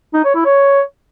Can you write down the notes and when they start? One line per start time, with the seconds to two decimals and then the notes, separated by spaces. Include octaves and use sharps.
0.14 D#4
0.24 C#5
0.35 E4
0.45 C#5